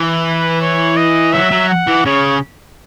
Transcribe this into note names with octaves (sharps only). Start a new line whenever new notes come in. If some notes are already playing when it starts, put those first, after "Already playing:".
Already playing: E3
B4
C#5
D#5
F#3 E5
F#3
F#5
E3
C#3 C#5